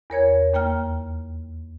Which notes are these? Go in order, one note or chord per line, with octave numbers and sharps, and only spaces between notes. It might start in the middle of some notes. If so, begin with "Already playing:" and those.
E2 A#4 C#5 G#6
D#2 A#3 G5 F6